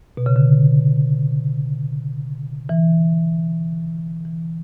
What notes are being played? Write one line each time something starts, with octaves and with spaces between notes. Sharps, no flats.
B2
C#3
D3
E3
E3